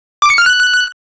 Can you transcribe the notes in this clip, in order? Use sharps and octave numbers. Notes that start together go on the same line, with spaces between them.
D6
C#7
F6
F#6